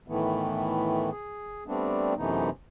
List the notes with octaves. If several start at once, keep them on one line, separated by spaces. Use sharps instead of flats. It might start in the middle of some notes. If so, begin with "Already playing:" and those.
A2 D#3 E3 A3 B3
G#4
G3 A3 B3 C4 D4
F#2 C3 E3 A3 B3 D#4